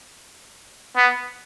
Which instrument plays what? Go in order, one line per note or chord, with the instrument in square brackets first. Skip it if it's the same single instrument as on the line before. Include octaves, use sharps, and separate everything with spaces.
[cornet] B3